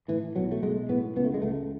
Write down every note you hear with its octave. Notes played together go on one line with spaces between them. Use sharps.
A2 E3
B1 F#3
A3
B1 G#3
A2 B3
C#2 B3
A3
G#3
C#2 A3